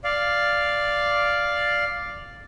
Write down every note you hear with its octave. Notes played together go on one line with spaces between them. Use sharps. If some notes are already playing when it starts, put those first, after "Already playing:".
D5 F5